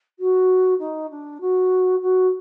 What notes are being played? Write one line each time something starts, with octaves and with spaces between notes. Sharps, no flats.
F#4
D#4
D4
F#4
F#4